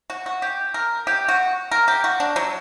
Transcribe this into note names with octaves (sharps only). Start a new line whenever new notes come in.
F#4
F#4
G4
A#4
G4
F#4
A#4
G4
F#4
D4
F#3